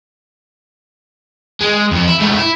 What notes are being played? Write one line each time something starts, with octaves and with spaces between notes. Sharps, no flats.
G#3
F2 F3
E4
G#2 A3
E4